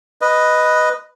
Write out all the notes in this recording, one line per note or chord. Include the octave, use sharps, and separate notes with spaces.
B4 D#5